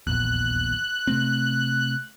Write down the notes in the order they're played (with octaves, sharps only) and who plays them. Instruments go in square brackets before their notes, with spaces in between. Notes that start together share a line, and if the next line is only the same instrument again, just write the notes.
[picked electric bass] D#1 A#1 E2 [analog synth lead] F#6
[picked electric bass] C3 A3 C4